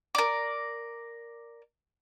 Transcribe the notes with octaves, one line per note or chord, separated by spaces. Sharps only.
A#4 D5